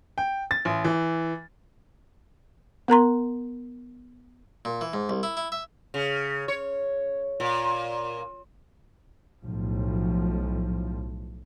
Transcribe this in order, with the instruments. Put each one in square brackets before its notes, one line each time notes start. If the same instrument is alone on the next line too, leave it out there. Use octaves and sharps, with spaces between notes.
[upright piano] G5
A6
A1
E3
[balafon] B3 A#4 A#5 C6
[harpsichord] A#2
E3
G#2
C2
E4
E4
E5
[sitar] C#3
C#5
A#2
[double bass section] B1 A2 F3